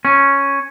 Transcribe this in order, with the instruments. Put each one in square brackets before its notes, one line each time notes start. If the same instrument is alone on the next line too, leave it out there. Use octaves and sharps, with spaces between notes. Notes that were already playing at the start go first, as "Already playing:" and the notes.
[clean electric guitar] C#4